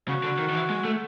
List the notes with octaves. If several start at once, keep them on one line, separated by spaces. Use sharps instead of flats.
C#3 F#4
D3
D#3
D#3
E3
G#3
A3